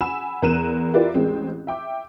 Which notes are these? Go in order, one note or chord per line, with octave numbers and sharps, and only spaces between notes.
F#5 G#5 B5 E6 E7
E2 A#4 A#5 F#6 D#7 E7
E4 F4 G4 A#4 B4 D5
A1 G#3 C4
E5 G5 D6